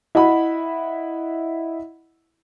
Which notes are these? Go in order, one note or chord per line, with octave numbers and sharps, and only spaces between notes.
E4 D#5 E5 F#5 B5